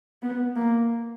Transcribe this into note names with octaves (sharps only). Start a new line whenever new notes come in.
B3
A#3